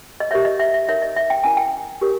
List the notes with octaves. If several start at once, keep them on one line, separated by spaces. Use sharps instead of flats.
D#5
G4 A#4 C#5 E5
D#5
E5
E5
D#4 A#4 C#5 E5
D#5
E5
G5
C#4 E4 A#4 C#5 G#5
G5
G4 A#4 C#5